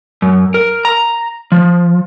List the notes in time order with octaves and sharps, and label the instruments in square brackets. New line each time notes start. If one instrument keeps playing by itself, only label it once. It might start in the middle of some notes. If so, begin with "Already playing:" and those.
[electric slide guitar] F#2
A#4
A#5
F3